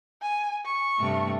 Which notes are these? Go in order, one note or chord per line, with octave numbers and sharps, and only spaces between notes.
G#5
C#6
G2 C3 A3